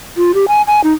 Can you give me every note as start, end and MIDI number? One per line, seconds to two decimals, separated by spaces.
0.17 0.34 65
0.34 0.45 67
0.48 0.62 80
0.67 0.81 80
0.84 0.92 63